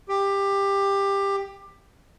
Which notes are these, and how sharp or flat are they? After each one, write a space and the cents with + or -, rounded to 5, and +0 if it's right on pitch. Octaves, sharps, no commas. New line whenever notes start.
G4 +15